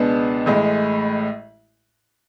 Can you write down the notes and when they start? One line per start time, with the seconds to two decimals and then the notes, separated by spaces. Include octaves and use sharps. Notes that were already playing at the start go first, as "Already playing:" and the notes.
Already playing: C#2 B2 G#3 B3 D4
0.46 A1 A2 G#3